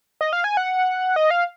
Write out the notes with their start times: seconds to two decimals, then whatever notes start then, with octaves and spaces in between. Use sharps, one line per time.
0.21 D#5
0.33 F5
0.44 G#5
0.57 F#5
1.16 D#5
1.30 F5